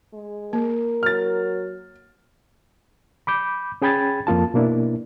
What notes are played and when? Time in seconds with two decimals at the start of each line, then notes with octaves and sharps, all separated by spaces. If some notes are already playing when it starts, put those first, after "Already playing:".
0.13 G#3
0.53 A#3 A#4
1.03 F#3 F6 A6
3.27 B5 D6 G6
3.82 C#4 G#4 G5 B5 G#6 A6
4.27 F2 A#3 F4 A5
4.54 B2 A#3 D4 E4